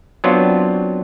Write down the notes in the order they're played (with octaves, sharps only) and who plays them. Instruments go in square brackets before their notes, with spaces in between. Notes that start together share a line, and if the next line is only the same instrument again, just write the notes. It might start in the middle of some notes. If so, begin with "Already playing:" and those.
[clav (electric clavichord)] F#3 B3 C4 D4 F4 F#4